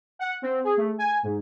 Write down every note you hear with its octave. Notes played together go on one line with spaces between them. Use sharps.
F#5
C4
G#4
A3
G#5
G#2